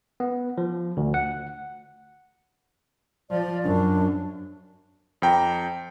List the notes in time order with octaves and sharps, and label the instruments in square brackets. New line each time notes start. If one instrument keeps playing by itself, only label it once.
[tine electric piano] B3
F3
D2
F#5
[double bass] F3 [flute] D5
[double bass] F#2 [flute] D4
[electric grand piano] F2 G5 A#5